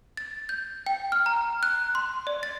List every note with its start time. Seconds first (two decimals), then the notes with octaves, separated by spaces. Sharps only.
0.17 A6
0.49 G6
0.86 G5
1.12 F6
1.26 A#5
1.63 F#6
1.95 C6
2.27 D5
2.43 A6